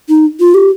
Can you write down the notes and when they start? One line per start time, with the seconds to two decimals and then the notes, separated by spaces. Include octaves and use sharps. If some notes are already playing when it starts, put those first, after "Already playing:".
0.09 D#4
0.40 F4
0.54 G4